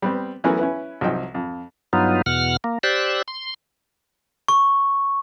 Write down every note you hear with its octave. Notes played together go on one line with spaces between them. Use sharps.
G3 B3 C4
E3 F#3 A3 B3 C#4 A#4
C#4 E4 B4
C2 F3 F#3 D#4 G5
F2
G2 F#3 B3 D#4 F4
E2 B2 F#5 F6
A#3
G4 C5 D5 E6 F#6
C6
C#6